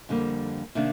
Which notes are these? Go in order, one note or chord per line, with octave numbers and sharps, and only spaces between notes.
F2 D3 G3 A#3
C3 D#3 A#3 D4